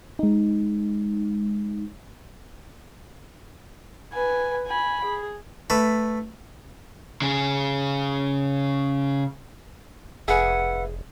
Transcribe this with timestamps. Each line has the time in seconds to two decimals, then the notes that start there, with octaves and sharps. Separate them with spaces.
0.19 G#3 D#4
4.13 B4 G#5
4.67 G#5 B5
5.05 G#4
5.70 A3 B4
7.22 C#3 G#4
10.28 F1 G#4 B4 E5 F#5